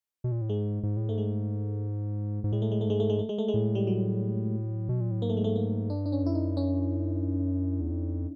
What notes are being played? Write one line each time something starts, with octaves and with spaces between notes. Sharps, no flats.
B2
A#2
A2
G#2 G#3
G#2
A2
G#2 A3
G#3
G#2
A2 G#3
A3
G#3
A3
G#2 G#3
A3
G#3
A3
G#3
A3
G#3
A2
G3
F#3
B2
A#2
A2
G#2 A#3
A3
G#3
A3
A#3
G2 D4
D4
C#4
F#2 E4
D#4
C#4
E2
F2